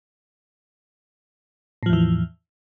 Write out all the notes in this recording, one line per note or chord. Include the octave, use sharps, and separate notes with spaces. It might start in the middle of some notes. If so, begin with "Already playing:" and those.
E2 A2 E3 F3